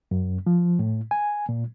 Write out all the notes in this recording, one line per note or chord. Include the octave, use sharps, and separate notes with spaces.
F#2
F3
A2
G#5
A#2